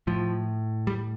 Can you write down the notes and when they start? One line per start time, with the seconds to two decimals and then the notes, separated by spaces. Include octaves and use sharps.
0.07 A2 F3
0.87 G3